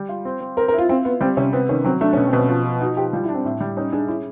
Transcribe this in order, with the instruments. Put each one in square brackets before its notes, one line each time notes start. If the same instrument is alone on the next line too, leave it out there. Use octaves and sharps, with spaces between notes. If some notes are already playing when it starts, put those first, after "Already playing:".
Already playing: [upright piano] G3
F4
C4
C4
[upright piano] C4 [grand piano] A#4
[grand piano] A#4
[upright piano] E4
[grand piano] F4
[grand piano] C4 [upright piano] F4
[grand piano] B3 [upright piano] F4
[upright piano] G3 [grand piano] C4
[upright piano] C3 [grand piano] C#4
[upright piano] B3 [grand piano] C4
[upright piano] D#3 [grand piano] C#4
[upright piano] F#3 [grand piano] C4
[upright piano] A3 [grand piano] D4
[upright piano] B2 [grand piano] C#4
[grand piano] C4
[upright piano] B2
[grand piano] C#4
[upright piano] F3
F3
[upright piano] D#4 [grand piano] F#4
[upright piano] F3 [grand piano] G4
[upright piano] G3 [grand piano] F4
[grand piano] E4
[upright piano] D4
[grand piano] C4
[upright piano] A2
G3
[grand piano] C#4 [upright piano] D#4
[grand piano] D4 [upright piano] G#4
[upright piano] C#4 [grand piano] E4